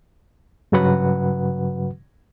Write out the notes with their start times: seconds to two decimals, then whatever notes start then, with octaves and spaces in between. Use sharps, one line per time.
0.72 G2 C#3 F#3 F#4 B4 F#5